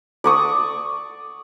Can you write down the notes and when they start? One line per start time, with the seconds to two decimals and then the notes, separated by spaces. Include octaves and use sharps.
0.24 D5 C#6 D#6